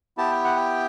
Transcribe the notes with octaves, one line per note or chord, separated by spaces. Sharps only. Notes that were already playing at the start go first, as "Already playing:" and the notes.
B3 E4 G4 A5
G5
F#5
G5